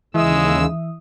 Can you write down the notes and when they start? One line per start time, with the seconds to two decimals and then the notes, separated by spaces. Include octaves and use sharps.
0.15 D#2 C#3 E3 G#3 E5 D#6 E6